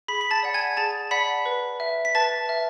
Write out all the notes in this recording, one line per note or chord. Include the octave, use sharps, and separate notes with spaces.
G#4 B5 B6
B6
A5 A6
D5 F#5
G#5 G#6
G#4 A5 A6
D5 F#5 B5 B6
B4
E5
B6
B4 A5 A6
E5